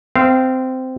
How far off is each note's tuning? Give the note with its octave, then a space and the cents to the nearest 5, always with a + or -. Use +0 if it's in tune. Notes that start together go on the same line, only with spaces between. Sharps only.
C4 -15 F5 -25